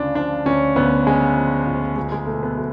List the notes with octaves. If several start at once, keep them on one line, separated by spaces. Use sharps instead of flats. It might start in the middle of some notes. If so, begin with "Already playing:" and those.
Already playing: D2 C#3 D4 F4
F3 D4
D2 C#4
D2 B3
C#3 G#3
F3
D2
C#2 G#3
G#3
B2 A3
B3
F#3 A3